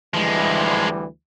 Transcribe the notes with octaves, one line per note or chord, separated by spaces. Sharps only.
D2 E3 F3 G3 G#3